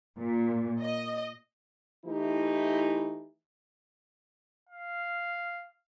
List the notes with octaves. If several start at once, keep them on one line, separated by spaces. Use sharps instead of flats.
A#2
D#5
E3 A3 D#4 E4 G4
F5